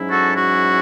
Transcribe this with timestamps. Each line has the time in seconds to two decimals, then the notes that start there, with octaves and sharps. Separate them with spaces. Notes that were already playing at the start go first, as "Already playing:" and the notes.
Already playing: G#2 F#3 C#4 E4
0.10 F#4 A4
0.34 F#4